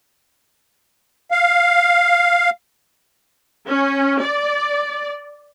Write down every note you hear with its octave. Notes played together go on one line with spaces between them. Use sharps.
F5
C#4
D5